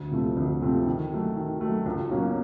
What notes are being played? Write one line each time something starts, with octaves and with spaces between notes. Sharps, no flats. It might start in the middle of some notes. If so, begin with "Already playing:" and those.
Already playing: D2
C3 F3 A3
D2
C3 F3 A3
D#3
F#3 A3
D#3
F#3 A3
C#2
B2 F#3 A#3 C#4